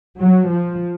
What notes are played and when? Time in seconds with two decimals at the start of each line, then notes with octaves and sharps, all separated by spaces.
0.20 F#3
0.50 F3